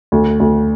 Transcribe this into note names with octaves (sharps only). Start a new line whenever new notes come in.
D2
D2